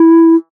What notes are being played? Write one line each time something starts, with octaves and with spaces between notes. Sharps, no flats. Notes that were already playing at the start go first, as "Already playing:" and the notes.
Already playing: E4